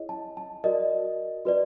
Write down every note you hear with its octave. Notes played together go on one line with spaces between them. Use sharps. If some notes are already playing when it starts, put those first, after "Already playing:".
Already playing: E4 G#4 C#5 D#5
A5
A5
F#4 A#4 D5 D#5
F#4 B4 D5